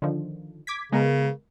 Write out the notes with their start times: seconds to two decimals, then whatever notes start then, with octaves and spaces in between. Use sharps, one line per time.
0.02 D3 D#3 F3
0.67 D6 G#6 B6
0.92 C#3 G#3 B3 A#4